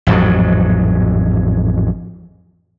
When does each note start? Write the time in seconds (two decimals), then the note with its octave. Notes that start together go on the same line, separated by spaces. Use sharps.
0.07 A1 F2 G#2 F#3